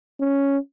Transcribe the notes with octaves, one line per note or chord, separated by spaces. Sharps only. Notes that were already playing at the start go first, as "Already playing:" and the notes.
C#4